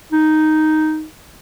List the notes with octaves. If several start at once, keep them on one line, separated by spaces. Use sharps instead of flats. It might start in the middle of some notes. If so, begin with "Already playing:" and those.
D#4